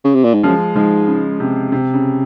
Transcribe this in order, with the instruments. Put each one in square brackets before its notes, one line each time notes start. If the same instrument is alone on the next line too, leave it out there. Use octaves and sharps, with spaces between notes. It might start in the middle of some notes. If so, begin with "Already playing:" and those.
[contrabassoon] C#3
C3
A#2
G#2
[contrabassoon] F#2 [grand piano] F3 G#3
[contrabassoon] G#2 [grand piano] F3 G#3
[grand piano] C#3
C3
C3
C#3